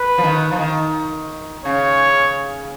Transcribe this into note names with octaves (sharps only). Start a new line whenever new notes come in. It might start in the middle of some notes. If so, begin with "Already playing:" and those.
Already playing: B4
F3
D#3
F3
D#3
C#3 C#5